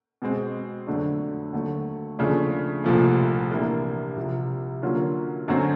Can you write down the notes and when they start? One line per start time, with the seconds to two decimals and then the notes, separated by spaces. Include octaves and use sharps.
0.22 B2 G#3 C4
0.87 F2 D3 F#3 A3 D4
1.52 D#2 D3 F#3 A3
2.19 D#2 C#3 F3 A3 D4
2.84 C2 A#2 F3 A3
3.50 C3 E3 G3 A#3 D4
4.16 C2 C3 F3
4.82 D3 F#3 A#3 C#4 F4
5.48 F#2 D3 F#3 A3 C4